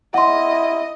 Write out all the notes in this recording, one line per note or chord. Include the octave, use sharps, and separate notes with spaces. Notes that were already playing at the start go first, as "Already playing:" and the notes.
E4 D#5 F#5 C6